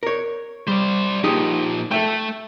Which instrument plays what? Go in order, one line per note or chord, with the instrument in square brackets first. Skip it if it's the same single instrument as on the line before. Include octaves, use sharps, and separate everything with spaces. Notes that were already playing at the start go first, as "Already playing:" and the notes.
[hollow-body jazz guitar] A#4 C#5
[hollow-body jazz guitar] G3 [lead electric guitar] C5 D5
[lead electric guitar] A#2 F3 [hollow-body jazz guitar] D#4 G4 G#4
[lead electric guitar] A3 [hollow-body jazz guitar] A4 E5 G5